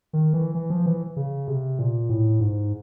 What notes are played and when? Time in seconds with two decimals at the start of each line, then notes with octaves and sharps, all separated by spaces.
0.13 D#3
0.33 E3
0.55 E3
0.70 F3
0.86 E3
1.16 C#3
1.47 C3
1.79 A#2
2.09 A2
2.40 G#2